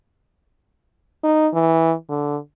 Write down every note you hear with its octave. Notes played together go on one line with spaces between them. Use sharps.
D#4
E3
D3